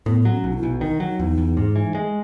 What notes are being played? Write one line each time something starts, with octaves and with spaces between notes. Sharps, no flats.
A2 B3
F#3 B3
C#4
B1
D#4
E4
B1
D#3 D#4
F#3
E2
E2
G#2
E3
G#3